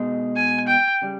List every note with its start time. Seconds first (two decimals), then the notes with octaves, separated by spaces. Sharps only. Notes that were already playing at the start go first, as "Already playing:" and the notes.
Already playing: B2 G#3 D#4 G#4
0.36 G#5
0.67 G5
1.02 C#3 G3